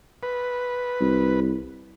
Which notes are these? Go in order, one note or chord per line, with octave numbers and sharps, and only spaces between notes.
B4
C2